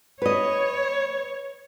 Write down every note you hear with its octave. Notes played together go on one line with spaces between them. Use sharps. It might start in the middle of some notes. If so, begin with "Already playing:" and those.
B4 C#5 D#5